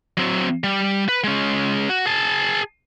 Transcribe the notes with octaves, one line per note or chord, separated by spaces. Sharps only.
F#3 C4
G3
B4
G#3 C#4
F#4
G#4 A5